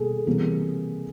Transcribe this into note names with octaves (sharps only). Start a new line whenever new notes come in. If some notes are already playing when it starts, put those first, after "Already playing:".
Already playing: B2 G3 A#3 G#4 A4
C3 E3 G3 A#3